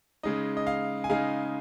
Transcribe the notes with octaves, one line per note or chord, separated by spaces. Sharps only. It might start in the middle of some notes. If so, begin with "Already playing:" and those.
C#3 G#3 D#4 D#5
D#5
F5
G#5
C#3 G#3 D#4 F5